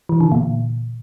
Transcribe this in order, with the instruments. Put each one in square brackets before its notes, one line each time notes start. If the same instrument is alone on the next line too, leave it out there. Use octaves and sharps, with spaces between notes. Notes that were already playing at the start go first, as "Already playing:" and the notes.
[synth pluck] E3
D3
A#2